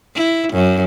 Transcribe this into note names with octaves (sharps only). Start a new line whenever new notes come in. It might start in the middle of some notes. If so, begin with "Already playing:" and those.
E4
F#2